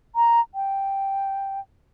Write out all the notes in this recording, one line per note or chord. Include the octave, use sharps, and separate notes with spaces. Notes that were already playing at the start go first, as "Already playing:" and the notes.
A#5
G5